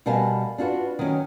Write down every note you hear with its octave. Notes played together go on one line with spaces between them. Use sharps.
B2 G3 A#4 F5 G#5 A5
D4 F4 F#4 B4
D#3 F#3 C#4